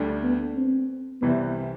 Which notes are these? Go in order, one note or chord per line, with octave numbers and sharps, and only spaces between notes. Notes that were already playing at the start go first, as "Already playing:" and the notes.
Already playing: D2 D3 G3
B3
C4
C2 C3 E3 G3 B3